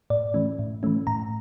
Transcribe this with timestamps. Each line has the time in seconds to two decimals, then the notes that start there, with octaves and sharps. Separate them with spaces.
0.10 A2 D5
0.34 E3 A3 C#4
0.59 A2
0.83 E3 A3 C#4
1.07 A2 A#5